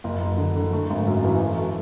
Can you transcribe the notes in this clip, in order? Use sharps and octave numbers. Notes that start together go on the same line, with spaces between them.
F#1
F#1
D3
D3
A3
G#1
F#2
E3
F#2
A3